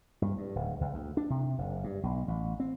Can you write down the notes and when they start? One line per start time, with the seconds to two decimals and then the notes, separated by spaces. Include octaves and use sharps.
0.22 G2
0.38 G2
0.55 D1
0.81 C#2
0.94 D2
1.17 D4
1.30 C3
1.58 F#1
1.84 G2
2.03 B1
2.28 A1
2.60 C4